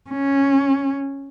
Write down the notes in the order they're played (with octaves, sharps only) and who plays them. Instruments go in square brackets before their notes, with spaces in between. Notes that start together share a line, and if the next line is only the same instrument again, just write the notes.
[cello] C#4